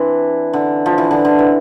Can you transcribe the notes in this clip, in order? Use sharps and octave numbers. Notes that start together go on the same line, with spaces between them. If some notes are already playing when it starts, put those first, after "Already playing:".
Already playing: E3 C4 D4
D3
F3
E3
D3
D3
E3